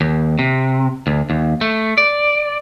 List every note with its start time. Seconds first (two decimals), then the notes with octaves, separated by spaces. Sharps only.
0.01 D#2
0.39 C3
1.07 D2
1.30 D#2
1.61 A3
1.98 D5